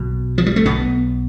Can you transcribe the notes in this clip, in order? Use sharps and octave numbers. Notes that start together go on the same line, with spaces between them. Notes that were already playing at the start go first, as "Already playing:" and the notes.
Already playing: B1 B2
F3
G3
A3
B1 B2 B3